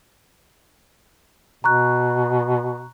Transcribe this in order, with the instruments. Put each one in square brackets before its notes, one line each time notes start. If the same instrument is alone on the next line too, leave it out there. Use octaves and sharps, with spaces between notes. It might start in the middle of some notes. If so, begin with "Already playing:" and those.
[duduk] B2 [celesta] A#5 C#6 F#6